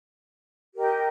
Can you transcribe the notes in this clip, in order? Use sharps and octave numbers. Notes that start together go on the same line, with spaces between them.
G4 A#4 D#5 G5